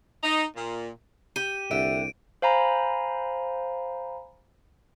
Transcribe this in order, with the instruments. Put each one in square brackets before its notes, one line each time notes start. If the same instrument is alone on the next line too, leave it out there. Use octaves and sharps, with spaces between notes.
[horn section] D#4
A#2
[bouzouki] G4 [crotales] D#7
[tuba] C2 [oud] D3 E5 [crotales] D7
[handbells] C5 F5 G#5 A#5 B5